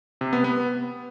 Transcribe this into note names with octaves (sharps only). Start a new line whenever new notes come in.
C3
B3
B3